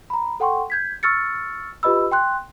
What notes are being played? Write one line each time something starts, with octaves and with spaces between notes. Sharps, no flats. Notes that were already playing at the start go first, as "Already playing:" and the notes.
A#5 B5
A4 F#5 G5 C6 C#6
G6 G#6 B6
C#6 E6 F6 A6 C#7
F4 G4 B4 D#5 B5 E6
G5 C6 F#6